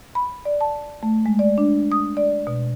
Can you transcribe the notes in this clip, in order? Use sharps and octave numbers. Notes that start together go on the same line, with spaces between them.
B5
D5
A5
A3
G#3
D5
D4
D#6
D5
B2